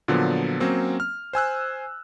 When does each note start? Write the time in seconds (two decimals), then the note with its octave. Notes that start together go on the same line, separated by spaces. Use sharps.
0.08 A#2 D3 F3 F#3 B3
0.60 F#3 A#3 C4 C#4
1.00 F6
1.33 C5 G#5 E6 F#6